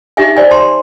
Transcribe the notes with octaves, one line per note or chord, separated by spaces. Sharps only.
D#4 G4 E5 G#5
C5 D5 G#5
A5 C6